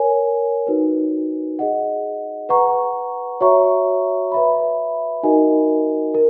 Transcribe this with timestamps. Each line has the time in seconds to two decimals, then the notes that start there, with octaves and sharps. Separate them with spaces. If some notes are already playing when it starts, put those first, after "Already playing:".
Already playing: A#4 C#5 G#5
0.67 D#4 F#4 B4
1.59 G#4 D#5 F#5
2.49 B4 F#5 A#5 C#6
3.41 F#4 C#5 E5 A#5 C#6
4.32 B4 E5 B5
5.23 D#4 F#4 A#4 D#5 G#5
6.14 A#4